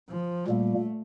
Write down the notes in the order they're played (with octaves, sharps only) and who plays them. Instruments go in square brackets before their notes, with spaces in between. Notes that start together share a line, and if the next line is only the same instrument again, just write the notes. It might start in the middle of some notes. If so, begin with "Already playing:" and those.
[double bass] F3
[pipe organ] A#2 G3 A#3 [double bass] A3